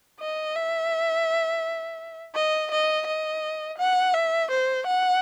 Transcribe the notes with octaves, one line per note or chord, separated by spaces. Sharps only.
D#5
E5
D#5
D#5
D#5
F#5
E5
C5
F#5